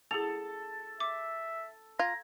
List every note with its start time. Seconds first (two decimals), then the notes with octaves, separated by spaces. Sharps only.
0.11 G#4 A4 F7
1.00 E5 D6
1.99 F4 A#5 G#6